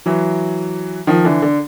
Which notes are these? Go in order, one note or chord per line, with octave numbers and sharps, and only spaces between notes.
E3 F#3
D#3 F3
D3 E3
D3